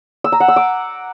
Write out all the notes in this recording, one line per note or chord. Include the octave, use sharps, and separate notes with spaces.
E6
A#5
F#5
E6
D6